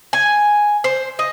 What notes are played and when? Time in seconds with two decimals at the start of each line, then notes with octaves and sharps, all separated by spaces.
0.13 G#5
0.84 C5
1.19 D#5